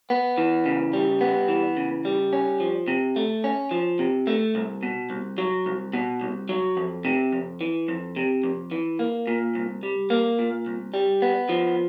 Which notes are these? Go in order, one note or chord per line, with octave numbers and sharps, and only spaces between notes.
B3
E3
C#3
G3
B3
E3
C#3
G3
C#4
F3
C3
A3
C#4
F3
C3
A3
C2
B2
C2
F#3
C2
B2
C2
F#3
F2
C3
F2
E3
F2
C3
F2
E3
A#3
A#2
C2
G3
A#3
A#2
C2
G3
B3
F3